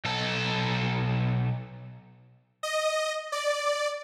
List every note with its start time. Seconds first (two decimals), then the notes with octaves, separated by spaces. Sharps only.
0.05 B1 A4
2.63 D#5
3.32 D5